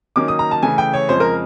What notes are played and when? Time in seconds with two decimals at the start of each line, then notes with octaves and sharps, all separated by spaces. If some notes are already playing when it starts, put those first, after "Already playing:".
0.16 D#3 F#3 A#3 C#4 D6
0.28 D#6
0.39 A#5
0.51 A5
0.62 C#3 E3 A3 G#5
0.78 G5
0.93 C#5
1.09 F2 C#3 F3 G#3 C5
1.20 A#4